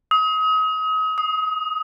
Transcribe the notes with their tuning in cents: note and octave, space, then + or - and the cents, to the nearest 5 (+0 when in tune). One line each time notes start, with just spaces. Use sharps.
D#6 +35
D#6 +5